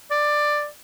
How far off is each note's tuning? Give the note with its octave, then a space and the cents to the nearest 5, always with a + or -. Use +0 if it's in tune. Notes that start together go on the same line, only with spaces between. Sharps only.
D5 +10